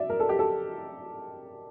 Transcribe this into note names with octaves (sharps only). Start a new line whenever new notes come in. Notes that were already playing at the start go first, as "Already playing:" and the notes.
Already playing: D5 E5
A#4
A4
G4
A4